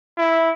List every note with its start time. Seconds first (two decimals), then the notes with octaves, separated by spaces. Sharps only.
0.17 E4